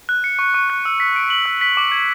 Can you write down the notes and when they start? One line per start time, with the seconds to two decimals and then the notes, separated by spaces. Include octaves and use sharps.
0.09 F#6
0.24 C#7
0.39 C#6
0.54 C#6
0.70 F#6
0.85 E6
1.00 B6
1.16 D7
1.30 F#7
1.46 E6
1.61 B6
1.77 D6
1.92 G#6